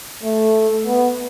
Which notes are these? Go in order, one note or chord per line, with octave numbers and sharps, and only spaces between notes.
A3
B3